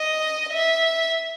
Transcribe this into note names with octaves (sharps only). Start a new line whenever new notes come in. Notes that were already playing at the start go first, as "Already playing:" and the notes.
Already playing: D#5
E5